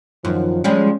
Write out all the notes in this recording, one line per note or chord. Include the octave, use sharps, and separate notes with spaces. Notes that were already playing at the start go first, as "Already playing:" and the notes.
F#2 D#3 F3
F3 G3 G#3 C#4 C#5